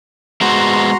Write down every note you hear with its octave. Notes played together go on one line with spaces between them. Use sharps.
G#3 B3 F#4 C5 A#5 C6